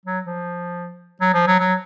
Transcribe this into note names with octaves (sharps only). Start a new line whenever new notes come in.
F#3
F3
F#3
F3
F#3
F#3